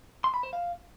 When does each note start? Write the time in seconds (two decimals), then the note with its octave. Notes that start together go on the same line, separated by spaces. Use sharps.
0.24 C6
0.34 B5
0.43 C5
0.53 F5